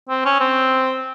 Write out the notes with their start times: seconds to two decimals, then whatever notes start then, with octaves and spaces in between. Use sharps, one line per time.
0.09 C4
0.25 C#4
0.40 C4